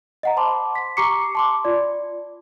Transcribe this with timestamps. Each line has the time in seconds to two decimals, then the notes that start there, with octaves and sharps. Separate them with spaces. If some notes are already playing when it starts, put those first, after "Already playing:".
0.23 D#5 F#5 A#5
0.37 C5 A5 B5 C6 D6
0.75 B6
0.97 G4 A#5 C#6 D6 C7 C#7
1.35 A5 C6 D6
1.65 F4 D5